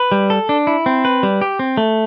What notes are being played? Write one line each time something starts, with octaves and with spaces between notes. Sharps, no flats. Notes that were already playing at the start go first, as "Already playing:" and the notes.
Already playing: B4
G3
A4
D4
E4
C4
B4
G3
G4
C4
A3